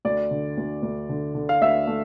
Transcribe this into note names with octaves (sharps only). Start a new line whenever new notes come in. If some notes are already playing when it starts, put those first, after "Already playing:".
D2 D5
D3
D2
D2
D3
D3
F5
D2 E5
A3